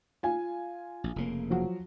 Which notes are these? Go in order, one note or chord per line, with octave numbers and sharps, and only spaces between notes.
F4 G#5
A#1
F1 C#3 A#3
F3 F#3 F#4